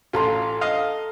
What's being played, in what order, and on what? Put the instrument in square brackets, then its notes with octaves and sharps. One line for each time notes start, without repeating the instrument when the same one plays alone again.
[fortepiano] A1 F4 [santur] A4 A#5 C6
[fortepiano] D#5 F5